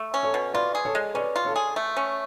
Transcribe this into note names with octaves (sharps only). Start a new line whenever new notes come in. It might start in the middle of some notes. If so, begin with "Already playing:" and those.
Already playing: A3
C#4
A4 C#5
B2
F4 B4 D5
G#4
A4 C#5
G#3
C#4 B4 D5
F4
A4 C#5
G#4
A3
C#4